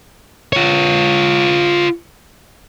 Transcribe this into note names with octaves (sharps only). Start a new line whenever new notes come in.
F4 C#5